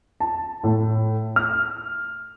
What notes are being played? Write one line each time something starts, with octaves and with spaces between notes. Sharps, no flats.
A5
A2
F6